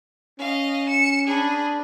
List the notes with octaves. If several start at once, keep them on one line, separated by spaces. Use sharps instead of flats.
C#4 D#5 F5
C#7 E7
D4 G#4 B5